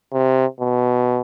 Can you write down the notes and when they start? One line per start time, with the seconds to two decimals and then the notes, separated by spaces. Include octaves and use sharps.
0.12 C3
0.60 B2